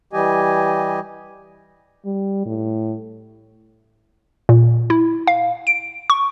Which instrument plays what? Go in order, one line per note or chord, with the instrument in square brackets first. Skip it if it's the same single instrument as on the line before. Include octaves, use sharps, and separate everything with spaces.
[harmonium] E3 G3 G4 D#5 G#5
[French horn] G3
A2
[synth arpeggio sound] A#2
E4
F5
D7
C#6